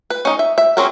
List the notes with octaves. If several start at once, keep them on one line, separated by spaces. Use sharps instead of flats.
B4
C#4 D#4
E5
E5
F#3 C4 C#4 G#4 A#4